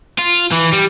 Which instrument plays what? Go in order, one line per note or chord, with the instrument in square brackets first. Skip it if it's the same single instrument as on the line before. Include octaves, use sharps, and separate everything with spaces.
[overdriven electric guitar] F4
E3
G3